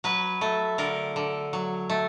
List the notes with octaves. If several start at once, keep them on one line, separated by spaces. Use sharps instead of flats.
F#3 B4
A3
D3 A#4
D3
F#3
A3